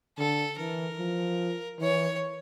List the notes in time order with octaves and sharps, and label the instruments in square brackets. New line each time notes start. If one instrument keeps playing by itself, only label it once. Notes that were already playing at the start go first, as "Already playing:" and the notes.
[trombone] D3 [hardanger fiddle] A4
[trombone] E3 [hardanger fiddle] A#4
[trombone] F3
[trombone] E3 [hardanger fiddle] C#5